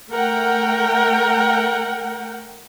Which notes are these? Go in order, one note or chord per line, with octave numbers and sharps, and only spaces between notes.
A3 A#4 F#5 G5